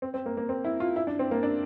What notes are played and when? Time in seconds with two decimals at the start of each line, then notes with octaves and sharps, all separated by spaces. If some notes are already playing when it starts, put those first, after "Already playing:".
0.02 C4
0.14 C4
0.26 A#3
0.37 A#3
0.49 C4
0.64 E4
0.80 F4
0.96 E4
1.07 D4
1.19 C4
1.31 A#3
1.43 D4